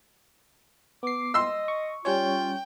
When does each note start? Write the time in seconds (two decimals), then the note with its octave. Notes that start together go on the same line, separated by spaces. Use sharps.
1.03 B3 D6 C7
1.34 D#5 C6 E6
1.68 C#6
2.05 G3 C#4 F4 C#5 G5